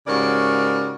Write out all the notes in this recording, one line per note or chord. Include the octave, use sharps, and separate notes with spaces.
G#2 C#3 G3 F#4 A#4 D5